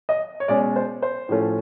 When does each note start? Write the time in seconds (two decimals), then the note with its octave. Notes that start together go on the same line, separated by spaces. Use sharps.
0.09 D#5
0.40 C#5
0.48 B2 G#3 C#4 D5
0.76 C5
1.02 C5
1.29 A2 F3 A3 C#4